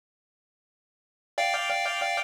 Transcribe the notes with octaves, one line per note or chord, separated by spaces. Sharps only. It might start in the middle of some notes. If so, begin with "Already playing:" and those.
D5 F5 G5